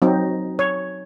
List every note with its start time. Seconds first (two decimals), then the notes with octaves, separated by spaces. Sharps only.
0.02 F#3 C4 D#4
0.59 C#5